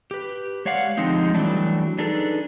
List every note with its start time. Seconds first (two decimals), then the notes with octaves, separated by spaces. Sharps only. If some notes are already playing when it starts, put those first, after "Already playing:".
0.11 G4 B4
0.65 G#3 C#5 D5 F5 F#5
0.97 D3 F3 G#3 C4 D#4 G4
1.34 E3 F#3 G3 A3 D4 E4
1.98 D4 D#4 G#4 A4 B4